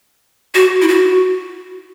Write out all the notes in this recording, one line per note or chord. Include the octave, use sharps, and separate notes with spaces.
F#4
E4
F#4